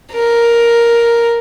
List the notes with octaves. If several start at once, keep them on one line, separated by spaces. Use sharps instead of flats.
A#4